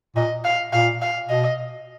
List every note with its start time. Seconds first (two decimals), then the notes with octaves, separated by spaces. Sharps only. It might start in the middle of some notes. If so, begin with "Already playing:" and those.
0.16 A#2 D#5
0.45 F5
0.72 A#2 F5
1.02 F5
1.29 B2 D#5